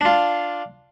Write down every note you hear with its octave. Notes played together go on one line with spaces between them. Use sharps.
D4 F4